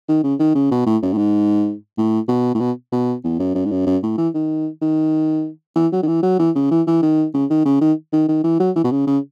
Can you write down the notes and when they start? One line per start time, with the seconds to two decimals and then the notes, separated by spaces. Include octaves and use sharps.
0.09 D#3
0.24 C#3
0.40 D#3
0.55 C#3
0.71 B2
0.87 A2
1.03 F#2
1.13 A2
1.18 G#2
1.98 A2
2.28 B2
2.55 A2
2.61 B2
2.92 B2
3.24 E2
3.39 F#2
3.55 F#2
3.65 G#2
3.71 F#2
3.87 F#2
4.03 A2
4.18 E3
4.35 D#3
4.82 D#3
5.76 E3
5.93 F#3
6.03 D#3
6.08 E3
6.23 F#3
6.39 E3
6.56 C#3
6.71 E3
6.87 E3
7.03 D#3
7.34 C#3
7.50 D#3
7.66 C#3
7.81 D#3
8.13 D#3
8.29 D#3
8.44 E3
8.60 F#3
8.76 E3
8.84 B2
8.92 C#3
9.07 C#3